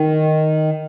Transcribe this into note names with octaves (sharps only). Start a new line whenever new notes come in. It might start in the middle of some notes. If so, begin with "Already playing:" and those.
Already playing: D#3